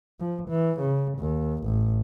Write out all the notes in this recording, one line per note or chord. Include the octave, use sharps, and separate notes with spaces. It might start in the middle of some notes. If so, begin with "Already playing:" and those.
F3
E3
C#3
D#2
A1